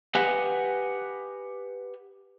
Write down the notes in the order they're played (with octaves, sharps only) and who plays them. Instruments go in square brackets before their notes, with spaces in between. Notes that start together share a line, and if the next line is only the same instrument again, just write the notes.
[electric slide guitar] G4 B4 D#5 F#5 G#5